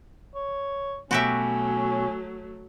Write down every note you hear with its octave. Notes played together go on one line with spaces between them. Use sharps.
C#5
B2 F#3 A3 C#4 F#4 G4 E5